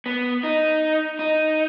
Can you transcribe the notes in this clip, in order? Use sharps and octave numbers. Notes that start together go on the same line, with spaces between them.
B3
D#4
D#4